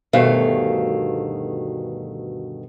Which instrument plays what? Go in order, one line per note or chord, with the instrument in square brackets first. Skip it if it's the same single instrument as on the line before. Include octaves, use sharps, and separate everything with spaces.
[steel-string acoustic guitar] D2 G2 B2 D#3 A3 F5